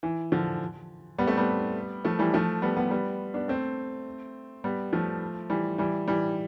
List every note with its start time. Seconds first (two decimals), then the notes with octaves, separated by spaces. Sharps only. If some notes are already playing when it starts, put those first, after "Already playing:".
0.03 E3
0.32 D3 F3
1.18 G3 B3
1.27 A3 C4
1.37 G3 B3
2.05 F3 A3
2.19 E3 G3
2.34 F3 A3
2.62 G3 B3
2.76 G3 B3
2.91 G3 B3
3.34 B3 D4
3.48 A3 C4
4.64 G3 B3
4.93 F3 A3
5.50 E3 G3
5.78 E3 G3
6.08 E3 G3